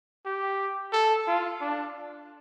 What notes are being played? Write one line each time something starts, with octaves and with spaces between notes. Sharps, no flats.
G4
A4
F4
D4